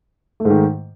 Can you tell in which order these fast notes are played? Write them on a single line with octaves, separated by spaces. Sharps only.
A3 G#2 D#3